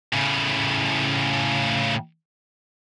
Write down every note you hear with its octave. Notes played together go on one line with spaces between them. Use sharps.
A2 C#3